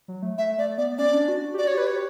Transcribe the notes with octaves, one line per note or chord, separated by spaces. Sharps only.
F#3
A3
A3 E5
A3 D5
B3 D5
C#4 D5
D4
F#4
G4
F#4 D5
C#5
G4 B4
G4 C#5